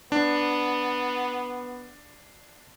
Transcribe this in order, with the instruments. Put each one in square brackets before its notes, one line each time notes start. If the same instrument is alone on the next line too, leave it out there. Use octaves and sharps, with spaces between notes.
[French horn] B3 [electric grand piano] D4